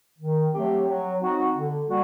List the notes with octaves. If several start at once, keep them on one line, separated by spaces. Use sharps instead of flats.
D#3
F#3 A3 C4 G4
F#3
C4 D#4 F#4
D3
G3 A#3 F#4